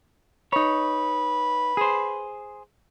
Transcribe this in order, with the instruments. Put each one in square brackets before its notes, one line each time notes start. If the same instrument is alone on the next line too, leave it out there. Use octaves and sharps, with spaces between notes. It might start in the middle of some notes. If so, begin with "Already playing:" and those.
[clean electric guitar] D#4 C#5 [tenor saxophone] B4
[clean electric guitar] G#4 C5